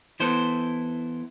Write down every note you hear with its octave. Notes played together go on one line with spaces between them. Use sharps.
E3 B3 E4 A4 C5